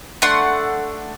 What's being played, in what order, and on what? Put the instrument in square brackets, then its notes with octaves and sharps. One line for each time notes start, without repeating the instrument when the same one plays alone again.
[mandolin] A3 D4 F#5 C6